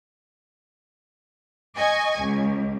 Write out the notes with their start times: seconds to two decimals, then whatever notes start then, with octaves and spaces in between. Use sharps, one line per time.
1.78 D#5 G#5 C#6
2.22 C#2